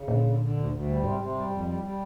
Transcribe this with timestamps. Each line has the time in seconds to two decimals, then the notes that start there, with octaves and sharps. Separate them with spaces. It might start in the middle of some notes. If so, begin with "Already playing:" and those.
Already playing: C#3
0.08 A#2 D3
0.24 D3
0.40 D3
0.56 D2
0.71 D2
0.88 G3
1.03 G#2 C3
1.19 C3
1.35 G3
1.50 F2
1.66 G3
1.83 G3